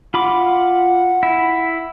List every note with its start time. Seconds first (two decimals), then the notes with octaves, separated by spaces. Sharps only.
0.14 F4 F#5 B5 D6
1.23 E4